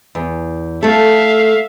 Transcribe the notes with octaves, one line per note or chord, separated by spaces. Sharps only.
E2
A3 A4 E5 F5